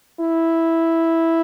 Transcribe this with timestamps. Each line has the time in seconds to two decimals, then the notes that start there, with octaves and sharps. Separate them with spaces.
0.20 E4